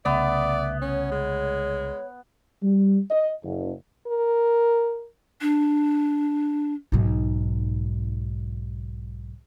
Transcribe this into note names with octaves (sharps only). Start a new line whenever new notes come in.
C2 C#3 A3 B3 D5 E5
C#4 C#5
G#3
G3
D#5
F#1
A#4
D4
B1 G#2